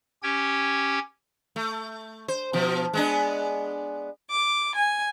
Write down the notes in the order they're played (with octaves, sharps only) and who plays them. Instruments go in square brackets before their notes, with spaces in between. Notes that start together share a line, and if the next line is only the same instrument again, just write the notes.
[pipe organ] C#4 G4 G5 G#6
[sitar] A3
C5
B2 F3
G#3 B3 D4
[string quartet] D6
G#5